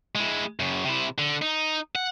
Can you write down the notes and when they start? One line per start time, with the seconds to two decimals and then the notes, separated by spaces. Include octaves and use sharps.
0.15 G#3 E4
0.60 F#2 C#3
0.85 C3 E4
1.18 D3
1.42 D#4
1.95 F#5